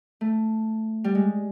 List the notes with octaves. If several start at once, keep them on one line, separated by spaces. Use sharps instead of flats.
A3
G3
G#3